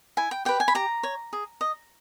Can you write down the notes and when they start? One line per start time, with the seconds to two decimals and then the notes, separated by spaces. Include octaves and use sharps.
0.17 E4 G#5
0.31 G5
0.45 G4 B4 G5
0.60 G#5
0.68 B5
0.75 G4 A#5
1.03 C#5
1.33 G#4
1.61 D#5